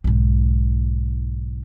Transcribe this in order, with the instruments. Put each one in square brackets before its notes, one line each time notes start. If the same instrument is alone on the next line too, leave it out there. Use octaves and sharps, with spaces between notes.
[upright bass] B1 G#2